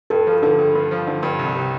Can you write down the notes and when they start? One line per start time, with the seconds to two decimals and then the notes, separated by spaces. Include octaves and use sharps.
0.10 G2 A4
0.27 F3
0.43 D3 A4
0.59 G2
0.75 G2
0.91 F3
1.07 D3
1.23 G2
1.39 C2
1.55 G3